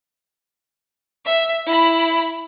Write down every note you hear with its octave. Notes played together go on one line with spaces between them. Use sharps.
E5
E4 B5